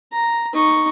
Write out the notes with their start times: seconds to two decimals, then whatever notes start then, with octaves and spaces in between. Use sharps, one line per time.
0.13 A#5
0.54 D#4 C#6